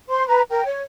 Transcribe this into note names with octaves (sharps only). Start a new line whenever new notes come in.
C5 C6
B4 A#5
A#4 G5
C#5